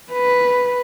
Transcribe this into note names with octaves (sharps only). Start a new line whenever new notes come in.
B4